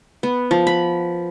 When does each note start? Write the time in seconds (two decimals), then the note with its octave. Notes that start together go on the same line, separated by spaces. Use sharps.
0.23 B3
0.51 F3
0.67 B5